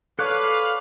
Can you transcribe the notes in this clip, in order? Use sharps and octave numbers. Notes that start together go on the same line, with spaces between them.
D4 A4 B4 C#5 F5 D6 F#6